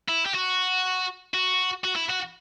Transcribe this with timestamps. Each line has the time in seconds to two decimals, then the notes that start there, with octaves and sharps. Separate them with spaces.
0.08 E4
0.26 G4
0.34 F#4
1.34 F#4
1.84 F#4
1.96 E4
2.10 F#4